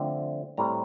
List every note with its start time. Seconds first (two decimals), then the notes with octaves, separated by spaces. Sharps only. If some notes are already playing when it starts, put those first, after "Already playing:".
Already playing: D3 F3 A3 C4
0.57 A2 G3 C4 A#5